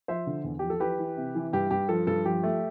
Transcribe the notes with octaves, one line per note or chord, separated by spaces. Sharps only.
F3 C5 E5
D3
E2
F3 G4
A4
E3 G4 B4
E3
C3
E3
G2 G4
G2 G4
F3 A4
G2 A4
F3 G4
A3